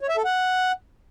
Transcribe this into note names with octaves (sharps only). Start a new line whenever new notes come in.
C#5
E5
A4
F#5